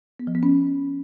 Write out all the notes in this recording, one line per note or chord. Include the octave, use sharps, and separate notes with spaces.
B3
F3
B3
C#4